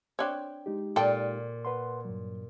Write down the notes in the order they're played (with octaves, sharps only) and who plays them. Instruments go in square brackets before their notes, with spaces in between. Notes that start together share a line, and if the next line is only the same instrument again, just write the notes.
[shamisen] C4 D4 C#5 [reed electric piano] G5
[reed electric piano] G#3 D#4 G4
[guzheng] A#2 [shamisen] A4 G5
[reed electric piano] B4 F#5 C6
G2 F#3